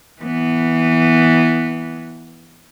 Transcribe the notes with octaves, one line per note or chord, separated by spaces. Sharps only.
E3 B3